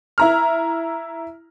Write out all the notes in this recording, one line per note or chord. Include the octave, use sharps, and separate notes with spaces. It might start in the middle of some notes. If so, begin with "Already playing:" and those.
E4 A#5 F6